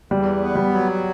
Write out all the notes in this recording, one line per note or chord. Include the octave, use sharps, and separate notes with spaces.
E2 G3
B3
G3
F#3